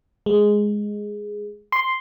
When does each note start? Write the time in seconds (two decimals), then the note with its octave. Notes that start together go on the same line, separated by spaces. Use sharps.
0.26 G#3
1.72 C6